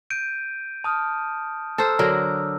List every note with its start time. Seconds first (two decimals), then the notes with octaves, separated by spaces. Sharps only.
0.10 G6 D7 D#7
0.84 A5 D#6 F6
1.78 A4 C5 A#5 E6 F6
1.99 D3 F#3 A#4